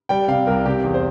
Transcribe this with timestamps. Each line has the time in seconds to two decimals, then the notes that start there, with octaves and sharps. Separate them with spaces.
0.09 G3 G5
0.28 C3 F5
0.47 C2 A#4
0.65 C3 G4
0.84 E2
0.94 C5